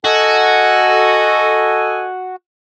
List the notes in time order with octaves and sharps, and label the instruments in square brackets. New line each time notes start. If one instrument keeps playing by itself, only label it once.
[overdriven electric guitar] F#4 [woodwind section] A4 D#5 G#5